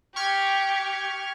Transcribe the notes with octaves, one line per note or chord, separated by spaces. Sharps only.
G4 C#6 F6 G#6